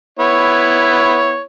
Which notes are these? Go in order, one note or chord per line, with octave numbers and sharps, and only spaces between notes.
B3 E4 C#5